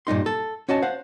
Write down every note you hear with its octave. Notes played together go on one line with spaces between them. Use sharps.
G2 A#2 D#4 C6
A4
C#4 F#4 D#5 A5
C5 F5 F#5